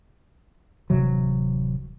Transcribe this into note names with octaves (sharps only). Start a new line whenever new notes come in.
D1 C3 E3 F#3